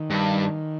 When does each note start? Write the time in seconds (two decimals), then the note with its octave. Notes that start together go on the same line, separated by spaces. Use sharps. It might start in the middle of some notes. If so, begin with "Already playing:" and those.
Already playing: D#3
0.10 G2